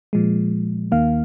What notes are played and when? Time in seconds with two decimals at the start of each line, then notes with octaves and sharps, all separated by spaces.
0.13 A#2 F3 G#3
0.92 D#2 D#3 A#3 F5